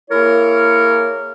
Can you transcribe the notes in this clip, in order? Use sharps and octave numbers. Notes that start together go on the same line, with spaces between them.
A#3 E4 G#4 A#4 C#5